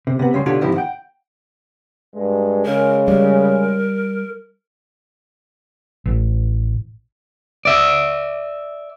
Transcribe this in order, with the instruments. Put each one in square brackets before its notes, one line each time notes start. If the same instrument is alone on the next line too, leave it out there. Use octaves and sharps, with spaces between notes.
[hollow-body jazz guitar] C3
C3 B3
C#2 C#3 G3 C6
B2 D3 D4 F4 G4 C#5
G#2 C3 D#3 F3 E4 G4
F#5 G5
[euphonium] G2 [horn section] G#3
[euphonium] C#3 [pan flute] A#4
[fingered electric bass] G3 [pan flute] A#4
[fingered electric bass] A1
[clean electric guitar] D5 E5